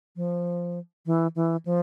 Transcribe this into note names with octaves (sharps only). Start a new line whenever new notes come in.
F3
E3
E3
F3